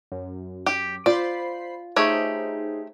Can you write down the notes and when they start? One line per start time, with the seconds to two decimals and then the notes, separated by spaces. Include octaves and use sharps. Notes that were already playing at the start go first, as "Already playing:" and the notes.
0.12 F#2
0.66 G4
1.06 F4 C5 D5 B5 C7
1.96 A3 D#4 G4 G#4 C5 C#5